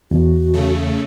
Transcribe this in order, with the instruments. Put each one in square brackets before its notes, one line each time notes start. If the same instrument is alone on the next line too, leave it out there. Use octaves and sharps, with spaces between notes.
[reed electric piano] E2 [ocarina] F#4
[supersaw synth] C#3 A3